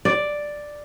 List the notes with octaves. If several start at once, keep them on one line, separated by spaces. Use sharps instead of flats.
D5